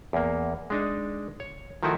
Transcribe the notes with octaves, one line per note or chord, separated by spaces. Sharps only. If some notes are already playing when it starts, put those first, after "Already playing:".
E2 A#3
G#3 D4 D#4
C#5
D#3 F3 A3 D#4 E4 F#4